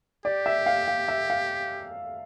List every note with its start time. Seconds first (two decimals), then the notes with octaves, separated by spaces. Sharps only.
0.25 G4 D5
0.46 E5
0.66 F5
0.88 F5
1.08 E5
1.30 F5